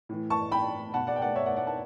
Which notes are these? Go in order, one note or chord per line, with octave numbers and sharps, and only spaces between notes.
A2 E3
A5 C#6
G5 B5
B2 F#5 A5
D5 F#5
G5
D5 F#5
C#5 E5
D5 F#5
D5 F#5
F#5 A5